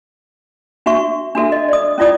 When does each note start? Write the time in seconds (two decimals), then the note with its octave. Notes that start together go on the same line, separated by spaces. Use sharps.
0.86 D4 F#4 E5 C#6
1.35 D4 F#4 A4 E5
1.52 D#5
1.69 D5 D#6
1.98 C#4 E4 F4 D5 D#6